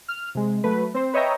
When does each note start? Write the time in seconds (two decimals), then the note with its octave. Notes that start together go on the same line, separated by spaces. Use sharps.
0.08 F6
0.35 C3 G#3
0.64 F#3 A3 B4
0.94 C4 C5
1.14 B4 C#5 D#5 E5 G5 A#5